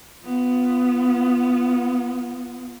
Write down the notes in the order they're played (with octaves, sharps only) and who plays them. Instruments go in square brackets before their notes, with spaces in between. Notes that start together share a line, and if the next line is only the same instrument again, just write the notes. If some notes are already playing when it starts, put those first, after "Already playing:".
[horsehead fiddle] B3 F4